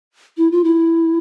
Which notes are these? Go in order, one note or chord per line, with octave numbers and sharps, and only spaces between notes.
E4
F4
E4